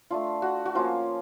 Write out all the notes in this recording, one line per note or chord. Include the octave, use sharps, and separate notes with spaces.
A3 D4 F4
F#4
F#4
F3 A#3 C#4 F4